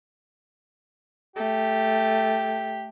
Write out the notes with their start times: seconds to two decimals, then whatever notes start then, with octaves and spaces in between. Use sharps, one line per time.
1.36 A3 G4